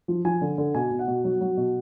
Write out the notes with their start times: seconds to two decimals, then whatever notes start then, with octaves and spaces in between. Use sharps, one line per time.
0.08 F3
0.25 F3 G#5
0.41 D3
0.58 D3
0.74 B2 G#5
0.91 B2
0.99 F#5
1.07 B2
1.24 F#3
1.41 F#3
1.57 B2